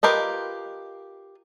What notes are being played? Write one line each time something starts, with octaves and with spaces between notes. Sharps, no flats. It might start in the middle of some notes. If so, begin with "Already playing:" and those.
F4 G4 A#4 B4 D#5